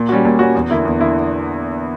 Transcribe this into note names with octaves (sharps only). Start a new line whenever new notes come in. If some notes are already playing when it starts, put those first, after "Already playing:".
Already playing: A#2
G3 C#4 F#4
A#2
G3 C#4 F#4
E2
D3 A#3 E4
E2
D3 A#3 E4